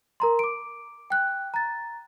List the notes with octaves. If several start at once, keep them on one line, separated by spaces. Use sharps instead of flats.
A#4 A#5 C6
D6 D7
G5 F#6
A#5 A6